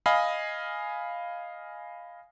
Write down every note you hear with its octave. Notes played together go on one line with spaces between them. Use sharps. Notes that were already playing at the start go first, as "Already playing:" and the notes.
D#5 F5 G#5 B5